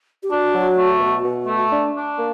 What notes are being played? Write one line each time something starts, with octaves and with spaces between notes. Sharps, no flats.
G4
D4 F#4
F#3
A3
B2
B2
A3
D4
D4
A#3